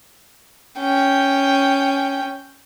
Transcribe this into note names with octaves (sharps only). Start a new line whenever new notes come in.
C#4 G5